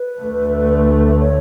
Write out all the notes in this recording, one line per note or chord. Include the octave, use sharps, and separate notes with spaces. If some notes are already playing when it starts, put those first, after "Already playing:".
Already playing: B4
D2 D3 A3
B4
C#5